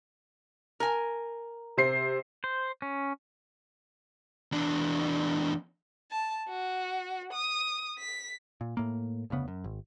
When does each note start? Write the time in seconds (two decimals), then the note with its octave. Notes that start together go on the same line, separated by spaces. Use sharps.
0.80 A#4 G#5
1.77 C3 C5 C7
2.44 C5
2.82 C#4
4.52 E2 D4
6.11 A5
6.49 F#4
7.33 D#6
7.99 B6
8.61 A#2
8.77 A2 A#3
9.30 F1 D2 C#3 B3
9.48 F#2
9.64 G#1